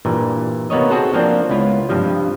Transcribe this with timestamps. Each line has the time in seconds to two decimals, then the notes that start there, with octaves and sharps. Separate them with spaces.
0.05 G2 A#2 E3
0.70 C3 A#3 B3 D#4 C#5 D#5
0.90 C4 F#4 G#4 A4 C5 F#5
1.13 F3 A#3 C4 D4
1.49 C#2 B3 E4 F4
1.89 G2 C3 F3 G3